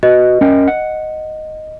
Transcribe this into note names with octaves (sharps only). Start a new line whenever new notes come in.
F#4 B4 D#5
C#4 A#4 G5
F#5